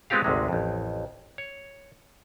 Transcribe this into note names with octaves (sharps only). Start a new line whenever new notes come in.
G#3 B3 C4 F4 G4 F5
G#1 D2 C3 G#3
A1 F2
C#5